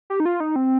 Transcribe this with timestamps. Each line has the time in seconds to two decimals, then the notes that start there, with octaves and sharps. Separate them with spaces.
0.10 G4
0.20 D#4
0.25 F4
0.40 D#4
0.56 C4